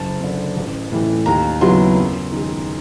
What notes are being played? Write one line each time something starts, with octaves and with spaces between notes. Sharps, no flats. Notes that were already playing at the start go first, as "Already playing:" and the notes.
Already playing: F#1 A5
F#2 D3
A1
A2 E3
D#2 A#5
C#3 F#3 B3 E4 C6
F#2
D#3 G#3